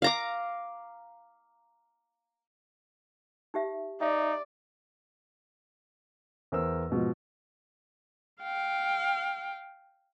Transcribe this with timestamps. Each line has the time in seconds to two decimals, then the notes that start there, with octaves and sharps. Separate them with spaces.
0.02 F5 A#5 D6
3.54 D#4 G4 E5
4.01 D#4 D5 E5
6.52 E2 A#4 C5 E6
6.90 G#2 B2 F3
8.42 F5 G5